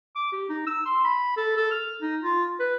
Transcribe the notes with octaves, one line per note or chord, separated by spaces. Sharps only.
D6
G4
D#4
E6
C6
B5
A4
A4
F6
D#4
F4
B4